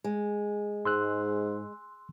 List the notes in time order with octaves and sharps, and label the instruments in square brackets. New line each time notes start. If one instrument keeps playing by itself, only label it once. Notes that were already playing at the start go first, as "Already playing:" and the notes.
[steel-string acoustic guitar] G#3
[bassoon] G#2 [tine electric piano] C6 E6 F#6